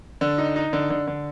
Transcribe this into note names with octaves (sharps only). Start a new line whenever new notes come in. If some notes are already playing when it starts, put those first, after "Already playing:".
D3
D#4
D#4
D3
D3
D3